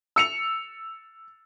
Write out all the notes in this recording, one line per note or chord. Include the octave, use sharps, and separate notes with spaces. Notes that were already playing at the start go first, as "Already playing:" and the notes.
E6 C#7 F7